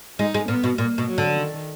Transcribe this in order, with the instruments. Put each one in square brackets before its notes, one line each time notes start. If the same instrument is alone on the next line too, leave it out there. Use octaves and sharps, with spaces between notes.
[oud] G#3 [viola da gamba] D#4
[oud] G#3
[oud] A#2 [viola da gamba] B3
[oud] B2
[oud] A#2 [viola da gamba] A#3
[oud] B2
[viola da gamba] F#3
[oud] D3
[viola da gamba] D#3